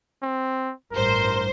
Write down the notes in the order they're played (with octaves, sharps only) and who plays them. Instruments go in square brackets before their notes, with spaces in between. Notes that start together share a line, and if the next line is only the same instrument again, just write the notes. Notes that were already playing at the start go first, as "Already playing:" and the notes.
[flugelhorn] C4
[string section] A1 G2 C5 [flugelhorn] A#4